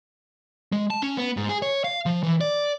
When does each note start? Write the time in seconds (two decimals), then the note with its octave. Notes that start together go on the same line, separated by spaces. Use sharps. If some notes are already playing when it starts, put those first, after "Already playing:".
0.72 G#3
0.90 A5
1.02 C#4
1.17 B3
1.37 G#2
1.49 G#4
1.62 C#5
1.84 F5
2.06 F3
2.23 E3
2.41 D5